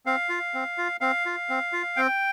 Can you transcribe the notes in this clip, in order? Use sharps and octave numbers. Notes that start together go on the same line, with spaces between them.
C4 F5
F4
C4
F4
C4 F5
F4
C4
F4
C4 G5